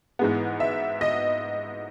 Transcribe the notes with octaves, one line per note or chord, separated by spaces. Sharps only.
G#2 E3 G#3 B3
E5
D#5